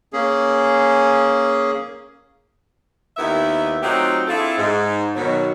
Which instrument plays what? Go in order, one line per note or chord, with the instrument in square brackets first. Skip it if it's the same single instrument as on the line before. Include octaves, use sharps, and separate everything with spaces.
[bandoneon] A#3 C#4 G#4
[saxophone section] D#2 D#3 B3 E4 E5
F#3 A3 C4 D#4 F4 G4
C4 D4 E4 F4 G#4 A4
G#2
B2 D#3 F#3